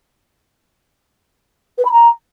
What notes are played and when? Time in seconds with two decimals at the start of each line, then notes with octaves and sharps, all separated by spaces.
1.78 B4
1.85 B5
1.92 A#5